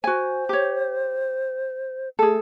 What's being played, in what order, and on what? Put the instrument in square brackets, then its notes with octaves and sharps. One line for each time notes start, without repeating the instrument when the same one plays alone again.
[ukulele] F#4 G#5 [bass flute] C5
[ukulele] G4 C#5
[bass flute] A3 [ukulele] G#4 A4